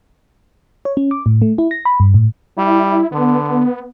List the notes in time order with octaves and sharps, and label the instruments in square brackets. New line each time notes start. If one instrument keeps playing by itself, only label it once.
[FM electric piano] C#5
C#4
D6
A2
A3
E4
A#6
B5
G2
A2
[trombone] G3 [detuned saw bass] E4
[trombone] D3 [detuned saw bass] B3